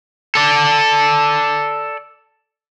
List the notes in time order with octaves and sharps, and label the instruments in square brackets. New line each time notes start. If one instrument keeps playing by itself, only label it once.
[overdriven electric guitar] A4 D5